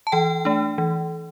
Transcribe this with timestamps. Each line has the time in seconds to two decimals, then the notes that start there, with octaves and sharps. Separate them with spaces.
0.07 A5
0.12 E3 G5
0.45 A3 D4
0.78 E3